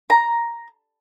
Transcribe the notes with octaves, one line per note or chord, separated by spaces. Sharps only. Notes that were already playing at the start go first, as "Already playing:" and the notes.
A#5